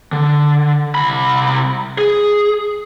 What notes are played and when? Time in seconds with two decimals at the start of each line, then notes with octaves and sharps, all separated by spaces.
0.12 D3
0.95 C2 B5
1.98 G#4